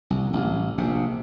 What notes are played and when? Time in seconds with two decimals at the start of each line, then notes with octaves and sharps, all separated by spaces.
0.10 C2
0.33 A1
0.78 A#1 C3